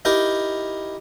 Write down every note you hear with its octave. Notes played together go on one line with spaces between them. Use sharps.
D#4 E4 G4 A#4 G5